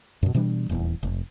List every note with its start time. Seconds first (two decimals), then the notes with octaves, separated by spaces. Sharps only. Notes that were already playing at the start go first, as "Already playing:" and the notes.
0.23 F#2 B2
0.35 B2 E3 G3 D4
0.69 D#1 E2
1.03 F1